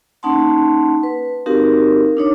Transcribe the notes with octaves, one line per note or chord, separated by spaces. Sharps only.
A#3 C#4 D#4 F#5 A5 C6
B4
C4 D#4 F#4 G4 A#4 F5
D4 D#4 C#5 D6